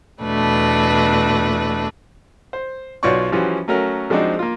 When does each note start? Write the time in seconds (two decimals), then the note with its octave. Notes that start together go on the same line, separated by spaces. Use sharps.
0.23 E2 B2 A3 D4 B4
2.53 C5
3.03 B1 F4 F#4 C#5 D5 C#6
3.32 E3 F3 G3 C#4 F4 F#4
3.68 F#3 A3 C#4 F#4 A#4
4.10 F3 G#3 C4 D4 D#4 F#4
4.39 A#3 F4